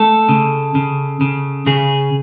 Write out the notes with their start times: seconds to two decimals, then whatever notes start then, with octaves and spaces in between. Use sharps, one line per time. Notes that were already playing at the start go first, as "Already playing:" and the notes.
Already playing: A3 A4
0.29 C#3
0.75 C#3
1.21 C#3
1.67 C#3 G#4